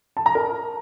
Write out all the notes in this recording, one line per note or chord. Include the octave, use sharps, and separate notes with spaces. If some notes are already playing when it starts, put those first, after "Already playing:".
A5
A#5
A#4